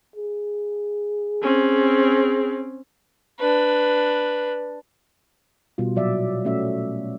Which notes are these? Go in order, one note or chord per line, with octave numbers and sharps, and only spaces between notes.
G#4
C4 C#4
D4 B4
B2 G3 F4
A#2 F#3 D5 E5
A3 C#4 F#4 E5